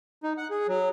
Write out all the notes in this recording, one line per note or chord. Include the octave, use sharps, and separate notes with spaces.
D#4
F#5
G#4
F#3